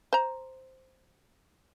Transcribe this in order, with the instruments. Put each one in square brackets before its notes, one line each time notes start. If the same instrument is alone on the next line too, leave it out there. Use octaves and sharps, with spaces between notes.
[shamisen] C5 A#5